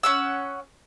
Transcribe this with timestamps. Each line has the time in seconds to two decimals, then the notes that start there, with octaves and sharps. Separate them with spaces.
0.03 C#4 F#5 E6